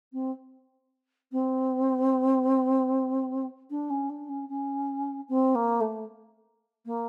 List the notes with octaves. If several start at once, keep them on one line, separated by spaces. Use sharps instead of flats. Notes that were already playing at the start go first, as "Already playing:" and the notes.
C4
C4
D4
C#4
D4
C#4
C#4
C4
A#3
A3
A#3